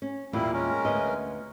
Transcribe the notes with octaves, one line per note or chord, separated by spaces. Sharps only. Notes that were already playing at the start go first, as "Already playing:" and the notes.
C#4
E2 A#2 G3 A#3 E4
G#3 C#4 A#4
D2 B3 D#5